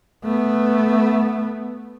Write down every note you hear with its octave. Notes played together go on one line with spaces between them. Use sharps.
A3 B3